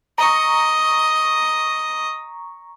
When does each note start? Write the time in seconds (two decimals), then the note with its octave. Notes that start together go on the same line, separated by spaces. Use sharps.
0.18 D#5 A#5 C#6